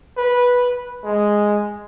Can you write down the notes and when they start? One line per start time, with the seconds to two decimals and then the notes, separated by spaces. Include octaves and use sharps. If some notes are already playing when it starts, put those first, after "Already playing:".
0.17 B4
1.04 G#3